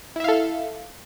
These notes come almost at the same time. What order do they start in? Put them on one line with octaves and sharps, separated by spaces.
E4 E5 F5 A4